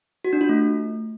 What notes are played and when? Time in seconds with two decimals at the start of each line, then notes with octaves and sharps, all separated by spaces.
0.25 F#4
0.33 D4
0.41 F4
0.49 A3